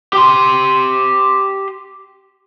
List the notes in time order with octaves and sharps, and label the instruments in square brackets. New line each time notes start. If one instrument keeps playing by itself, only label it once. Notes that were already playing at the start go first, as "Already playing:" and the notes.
[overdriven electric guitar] G4 C6